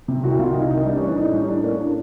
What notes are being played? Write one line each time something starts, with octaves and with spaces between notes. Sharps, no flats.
C3
C2 F#4
C3 F4
C2 D#4
D#3 D#4
G3 D4
C#4
E3
D4
A2 D#4
G3 C#4
A2 D4
A#3 C#4
A2 D4